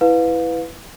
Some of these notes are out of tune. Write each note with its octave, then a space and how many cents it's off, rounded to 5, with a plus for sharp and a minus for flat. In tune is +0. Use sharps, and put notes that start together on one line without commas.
E4 +0 B4 +10 F5 +25